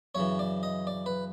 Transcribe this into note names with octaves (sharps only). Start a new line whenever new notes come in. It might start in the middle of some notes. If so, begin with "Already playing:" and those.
F#2 C#3 E3 C#5
D5
D#5
D5
B4